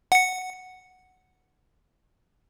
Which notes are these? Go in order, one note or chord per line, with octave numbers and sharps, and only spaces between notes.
F#5 C#7